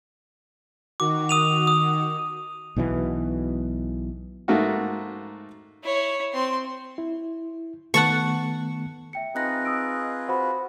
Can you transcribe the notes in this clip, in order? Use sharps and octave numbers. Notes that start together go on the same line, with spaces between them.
D#3 F#4 D6
D#6 D#7 F7
D#6
B1 B2 D3 E3
G#2 A3 A#3 F#4
E4 C#5
C4 C6
E4
D#3 A3 B3 F#5 A5 C#6
E5 G5 C#7
C4 D#4 F4 G#4 B4 F#6 A#6
D#6 E6 D7
F#4 C5 F5 B5